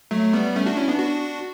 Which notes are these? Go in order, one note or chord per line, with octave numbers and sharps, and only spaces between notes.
F#3 A3
G3 B3
A3 C#4
D4 F#4
C#4 E4
B3 D4
D4 F#4